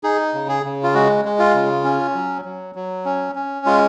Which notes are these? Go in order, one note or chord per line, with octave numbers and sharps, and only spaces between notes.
D#4 G#4
C#3
G#4
C#3
F4
G#3 F#4
G#3
F4
C#3
C#4
F#3
F#3
F#3
C#4
C#4
G#3 F4